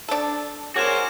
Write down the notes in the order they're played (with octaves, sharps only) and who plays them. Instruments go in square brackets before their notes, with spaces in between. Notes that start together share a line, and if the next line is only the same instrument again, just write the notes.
[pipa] D4 A4
[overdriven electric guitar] F#4 C5 [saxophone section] G#4 A#4 C#5 [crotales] D6 G#6 E7